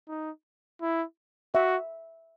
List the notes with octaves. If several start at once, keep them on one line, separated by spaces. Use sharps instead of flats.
D#4
E4
F#4 E5